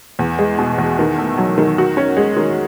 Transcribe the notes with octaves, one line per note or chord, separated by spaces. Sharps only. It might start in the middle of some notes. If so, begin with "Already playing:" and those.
E2
G#3
B2
E2
D#3
A3
F#3
D#3
F#4
C#4
G#3
D#3